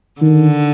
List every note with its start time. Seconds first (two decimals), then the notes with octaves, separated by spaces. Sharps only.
0.21 D3 D#3